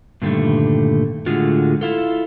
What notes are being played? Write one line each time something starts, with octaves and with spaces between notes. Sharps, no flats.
G2 A#2 D3 D#3 G3 A3
A2 D3 G#3 F4 F#4
E4 F4 A4